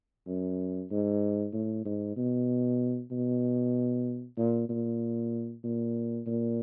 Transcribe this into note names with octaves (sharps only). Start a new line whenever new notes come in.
F#2
G#2
A2
G#2
B2
B2
A#2
A#2
A#2
A#2